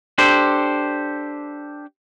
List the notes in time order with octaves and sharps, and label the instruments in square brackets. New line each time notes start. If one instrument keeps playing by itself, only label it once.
[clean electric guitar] D4 G4 A4 C5